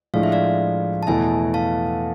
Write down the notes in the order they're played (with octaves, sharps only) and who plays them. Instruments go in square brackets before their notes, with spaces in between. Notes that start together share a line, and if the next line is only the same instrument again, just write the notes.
[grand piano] A2 F3 G#3 D4 [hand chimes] F5
[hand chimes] E5
D5 F5
A5
[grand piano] E2 B2 A3 E4 [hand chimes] E5 G#5
[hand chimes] F5 A5